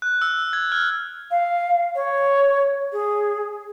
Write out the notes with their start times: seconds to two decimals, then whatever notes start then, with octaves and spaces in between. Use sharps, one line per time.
0.02 F#6
0.22 E6
0.53 G#6
0.72 F6
1.31 F5
1.95 C#5
2.92 G#4